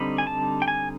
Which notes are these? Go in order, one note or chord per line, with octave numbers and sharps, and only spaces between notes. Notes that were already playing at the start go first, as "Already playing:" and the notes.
Already playing: D3 G3 C4 D#4 B5
G#5
A5
G5
G#5